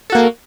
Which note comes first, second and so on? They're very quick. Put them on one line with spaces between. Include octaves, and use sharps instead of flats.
A4 F#4 A#3